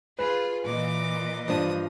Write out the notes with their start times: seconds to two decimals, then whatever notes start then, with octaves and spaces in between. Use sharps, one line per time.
0.19 F4 G#4 B4
0.65 A#2 E3 D#5 D6
1.48 G2 F3 D4 D#6